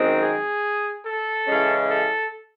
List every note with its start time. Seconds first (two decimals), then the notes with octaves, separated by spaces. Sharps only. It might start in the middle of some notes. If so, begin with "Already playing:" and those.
Already playing: F#2 D#3 G#3 C4 D#4
0.20 G#4
1.05 A4
1.47 C#3 E3 G#3 C#4
1.89 A4